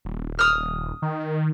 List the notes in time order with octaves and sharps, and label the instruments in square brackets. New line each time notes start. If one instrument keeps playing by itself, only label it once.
[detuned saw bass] D#1
[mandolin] D#6 F6
[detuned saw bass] D#3